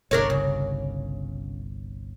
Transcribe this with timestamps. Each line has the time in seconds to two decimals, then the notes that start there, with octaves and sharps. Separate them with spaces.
0.11 G1 C2 D4 A#4 C#5
0.30 C#3